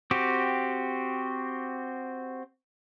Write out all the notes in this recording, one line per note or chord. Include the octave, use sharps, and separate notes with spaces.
C4 F#4 G4